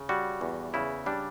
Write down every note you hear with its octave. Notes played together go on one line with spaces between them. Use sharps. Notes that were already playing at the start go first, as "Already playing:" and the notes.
Already playing: C#3
G3 F#4
E2
C#3 E4
G3 D4